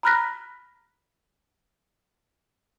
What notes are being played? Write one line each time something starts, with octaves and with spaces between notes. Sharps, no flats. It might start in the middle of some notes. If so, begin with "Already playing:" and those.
A#5 B5 F6 F#6 A#6 B6